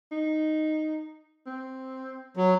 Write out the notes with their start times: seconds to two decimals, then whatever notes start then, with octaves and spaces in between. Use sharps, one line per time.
0.12 D#4
1.47 C4
2.37 F#3